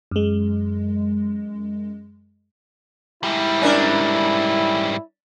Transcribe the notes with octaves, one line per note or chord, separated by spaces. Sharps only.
F#2 G#3
G#2 G3 E4
C#4 D4 A#4